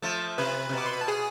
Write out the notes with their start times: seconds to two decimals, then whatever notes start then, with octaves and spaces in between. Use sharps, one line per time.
0.02 F3 A3
0.38 C3 B4 B5
0.69 C3
0.73 B2 D6
0.86 C6
0.93 B5
1.01 A5
1.08 G#4 G#5